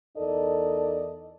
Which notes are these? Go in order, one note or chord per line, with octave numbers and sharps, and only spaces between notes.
E2 D#4 A4 A#4 D5 D#5